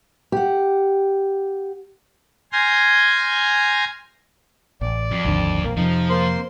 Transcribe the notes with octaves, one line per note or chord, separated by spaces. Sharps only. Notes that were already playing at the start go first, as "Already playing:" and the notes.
G4 F#5
G#5 C6 F6 G6 G#6 A#6
A1 D5
F2
G#1 D#2 D3
A#1 A#3
F2 C3 F3 D#4
A#3 C5 C6